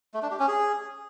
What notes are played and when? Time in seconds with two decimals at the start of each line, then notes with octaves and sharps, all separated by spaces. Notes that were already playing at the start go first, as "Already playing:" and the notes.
0.14 A3
0.22 D4
0.31 G4
0.39 C#4
0.48 G#4